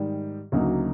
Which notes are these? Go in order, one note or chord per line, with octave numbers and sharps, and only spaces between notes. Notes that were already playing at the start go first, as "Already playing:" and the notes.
Already playing: G#2 D#3 G3
D2 C#3 F#3 A#3 D#4